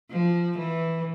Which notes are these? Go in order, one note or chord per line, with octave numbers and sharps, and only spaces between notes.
F3
E3